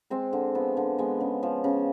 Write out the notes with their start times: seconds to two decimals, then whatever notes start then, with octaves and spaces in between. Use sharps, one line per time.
0.10 G#3 C4
0.33 D3
0.55 F3 B3
0.77 D3
0.98 G#3 B3
1.20 C#3
1.43 F3
1.64 C#3